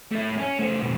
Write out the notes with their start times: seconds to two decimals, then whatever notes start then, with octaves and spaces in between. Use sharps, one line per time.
0.12 A3 E4
0.38 C#4
0.59 A3 C5
0.82 F2 B2